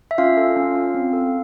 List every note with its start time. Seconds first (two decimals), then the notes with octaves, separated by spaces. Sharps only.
0.11 E5
0.18 C#4 F4 F5
0.37 A4
0.56 C#4
0.75 F4
0.94 C4
1.13 A4